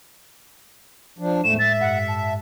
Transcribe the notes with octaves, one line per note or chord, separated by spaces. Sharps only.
F3 D4
E2 A2 G#3 A3 E7
E5 A6
G2 F#5
A5